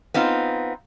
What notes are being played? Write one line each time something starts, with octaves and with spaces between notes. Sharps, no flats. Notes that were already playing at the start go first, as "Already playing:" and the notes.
B3 C4 D#4 F4